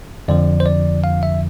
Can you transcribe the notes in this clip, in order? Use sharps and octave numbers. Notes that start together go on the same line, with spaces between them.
F2 D3 F3 D5
C5
D5
F5
E5